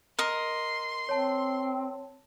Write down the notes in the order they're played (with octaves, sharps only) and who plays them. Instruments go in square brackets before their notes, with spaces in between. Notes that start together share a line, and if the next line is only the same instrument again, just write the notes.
[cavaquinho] A#4 D#5 [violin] C6
[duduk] C4 [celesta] C#5 A5